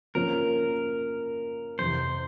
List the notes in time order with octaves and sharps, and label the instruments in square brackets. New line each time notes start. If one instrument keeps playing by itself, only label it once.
[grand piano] C#3 F3 A#3 C#4 [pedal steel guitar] A#4
[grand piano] F2 C3 E3 [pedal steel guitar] C5